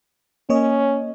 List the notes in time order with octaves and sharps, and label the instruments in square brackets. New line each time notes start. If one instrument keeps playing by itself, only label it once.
[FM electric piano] A#3 C#5 D#5 [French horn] C#4